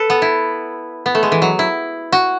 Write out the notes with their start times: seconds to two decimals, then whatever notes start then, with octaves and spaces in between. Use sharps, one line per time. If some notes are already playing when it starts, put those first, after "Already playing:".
Already playing: A4 B4
0.10 B3
0.22 E4
1.06 B3
1.15 A3
1.23 G#3
1.32 E3
1.42 F#3
1.59 E4
2.12 F#4